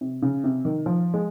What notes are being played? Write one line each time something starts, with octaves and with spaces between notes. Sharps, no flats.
C3
C#3
C3
D#3
F3
G#3